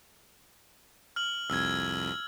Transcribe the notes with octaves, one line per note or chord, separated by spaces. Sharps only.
F6 F#7
C2 F2 E6 G#6